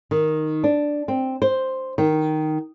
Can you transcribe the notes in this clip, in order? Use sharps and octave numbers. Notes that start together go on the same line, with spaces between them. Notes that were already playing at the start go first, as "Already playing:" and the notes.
D#3
D4
C4
C5
D#3